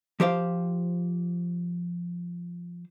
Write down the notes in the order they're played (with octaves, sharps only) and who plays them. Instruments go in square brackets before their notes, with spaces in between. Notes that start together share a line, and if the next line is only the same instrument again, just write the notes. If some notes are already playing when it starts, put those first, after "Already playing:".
[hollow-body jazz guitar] F3 G4 C5 F5